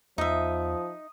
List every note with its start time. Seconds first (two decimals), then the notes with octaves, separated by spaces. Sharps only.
0.18 E2 F3 D#4 E5 D#6